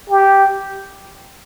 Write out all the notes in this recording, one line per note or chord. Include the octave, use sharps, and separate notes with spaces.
G4